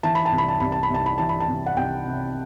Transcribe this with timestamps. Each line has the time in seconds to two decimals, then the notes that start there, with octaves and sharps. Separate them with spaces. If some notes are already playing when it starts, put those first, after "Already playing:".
0.03 E3 A5
0.15 B5
0.26 A5
0.32 C2
0.38 B5
0.48 A5
0.60 C2 B5
0.72 A5
0.83 B5
0.90 C2 A5
1.06 B5
1.18 E3 A5
1.29 B5
1.40 A5
1.48 C2
1.66 F#5
1.76 C2 G5
2.05 C3